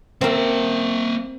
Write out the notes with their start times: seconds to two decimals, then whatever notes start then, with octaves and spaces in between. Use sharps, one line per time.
0.21 A#3 C4 A#4 E5